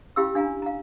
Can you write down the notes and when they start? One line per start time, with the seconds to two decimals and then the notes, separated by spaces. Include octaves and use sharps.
0.16 C#4 E4 G4 F5 B5 E6
0.35 D4 F5 G#5 A#5
0.62 F5 A#5